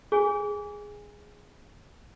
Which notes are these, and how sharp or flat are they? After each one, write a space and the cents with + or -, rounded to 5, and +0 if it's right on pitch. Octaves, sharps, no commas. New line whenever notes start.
G#4 +0 G#5 -20